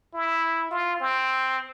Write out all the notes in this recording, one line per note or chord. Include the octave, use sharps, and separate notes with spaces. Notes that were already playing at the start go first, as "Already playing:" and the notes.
E4
F4
C4